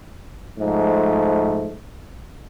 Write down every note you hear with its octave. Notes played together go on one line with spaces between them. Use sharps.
G#2 F3 A3